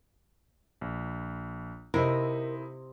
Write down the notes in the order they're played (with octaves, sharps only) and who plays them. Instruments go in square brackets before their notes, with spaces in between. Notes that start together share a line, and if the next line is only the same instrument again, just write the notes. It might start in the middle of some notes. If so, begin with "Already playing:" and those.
[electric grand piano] A#1
[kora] C3 C4 D#5 [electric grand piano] D#4 E4 B5 [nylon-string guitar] A#4